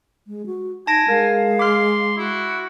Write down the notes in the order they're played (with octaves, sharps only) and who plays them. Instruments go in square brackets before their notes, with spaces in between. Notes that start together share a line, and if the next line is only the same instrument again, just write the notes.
[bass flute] G#3
F#4
[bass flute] D#4 [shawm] G#5 [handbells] A5 A#6 D7
[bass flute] G#3 [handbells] A#4 [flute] F5
[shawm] C6 [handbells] D6 F6
[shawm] E4 [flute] F#4